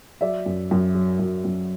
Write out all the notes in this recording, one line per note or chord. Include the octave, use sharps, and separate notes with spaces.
F#3 D5 E5
F#2
F#2
F#3
F#2
F#2